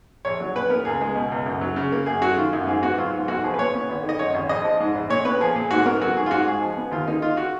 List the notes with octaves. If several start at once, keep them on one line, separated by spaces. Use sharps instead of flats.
A#1 C#5
F#3
A#2 B4
B3 A#4
C#2 G#4
G#3
B2
C#2
F#2
F#3
C#3
A#3
F#2 G#4
F#3 F#4
D#3 F4
F#2
G#2 G#4
B3 F#4
F#3 F4
G#2
B1 F#4
F3 G#4
B4
A#2 C#5
B3
G#1
D#3
D#5
F#2 C#5
G#1
A#1 D#5
F3
G#2
A#1
A#2 C#5
B3 B4
F3 G#4
A#2 G#4
G#2 F#4
B3 A#4
F#3 F#4
G#2 G#4
F4
G#2 F#4
G#3 G#4
F3
B3
D#2 F4
A#3 D#4
D#3 F4
F#4